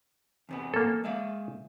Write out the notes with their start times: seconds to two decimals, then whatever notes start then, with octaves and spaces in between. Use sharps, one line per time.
0.49 E2 C3 B3
0.74 A#3 A4
1.04 G#3 E5 F5